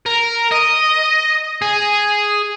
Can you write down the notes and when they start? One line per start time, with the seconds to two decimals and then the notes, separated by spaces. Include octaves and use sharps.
0.06 A#4
0.51 D#5
1.62 G#4